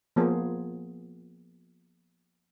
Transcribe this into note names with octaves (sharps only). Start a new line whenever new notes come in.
F3 A#3 B3 G#4 C5